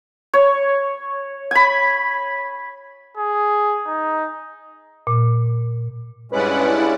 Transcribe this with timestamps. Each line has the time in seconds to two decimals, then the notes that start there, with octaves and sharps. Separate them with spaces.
0.34 C#5
1.51 G#5 B5
3.17 G#4
3.86 D#4
5.07 A#2
6.32 G2 G#3 C#4 E4 B4 D5 F#5